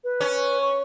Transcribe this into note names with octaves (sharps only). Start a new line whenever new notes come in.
B4
C#4
C#6